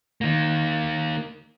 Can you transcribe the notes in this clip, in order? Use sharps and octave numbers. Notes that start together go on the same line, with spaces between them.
D#3 A#3